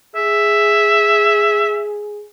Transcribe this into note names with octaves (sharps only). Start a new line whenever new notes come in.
G#4 E5